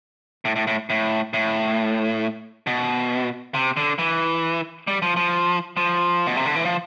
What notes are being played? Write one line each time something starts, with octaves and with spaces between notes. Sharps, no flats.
A2
A2
A2
A2
A2
B2
C3
D3
E3
G3
F3
F3
F3
B2
C3
D3
E3
F3